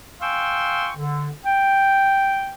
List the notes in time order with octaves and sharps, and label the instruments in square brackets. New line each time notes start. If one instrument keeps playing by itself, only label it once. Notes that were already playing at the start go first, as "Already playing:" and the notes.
[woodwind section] F5 G5 G#5 C6 C#6 E6
D3
G5